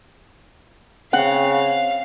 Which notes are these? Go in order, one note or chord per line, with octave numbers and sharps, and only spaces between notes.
C#3 C4 F5 F#5